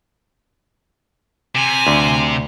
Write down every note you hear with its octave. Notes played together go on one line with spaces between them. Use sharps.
C3 G#5
D2